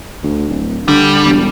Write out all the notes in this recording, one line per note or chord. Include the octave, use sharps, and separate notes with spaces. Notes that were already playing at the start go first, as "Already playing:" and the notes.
D2
D1
D3 G3
E1